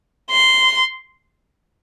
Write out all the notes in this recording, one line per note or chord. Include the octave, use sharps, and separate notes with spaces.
C6